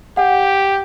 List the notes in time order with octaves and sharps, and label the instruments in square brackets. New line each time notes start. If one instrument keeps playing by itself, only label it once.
[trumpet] G4 [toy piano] F#5